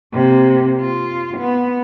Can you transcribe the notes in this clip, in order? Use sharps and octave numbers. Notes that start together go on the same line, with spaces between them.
C3 A#3
F4
B3